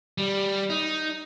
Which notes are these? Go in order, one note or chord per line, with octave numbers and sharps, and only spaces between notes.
G3
D#4